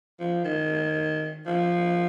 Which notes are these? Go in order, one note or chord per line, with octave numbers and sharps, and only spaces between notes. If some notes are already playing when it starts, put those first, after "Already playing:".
F3
D#3
F3